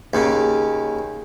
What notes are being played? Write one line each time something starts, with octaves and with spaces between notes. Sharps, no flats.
D#2 C#3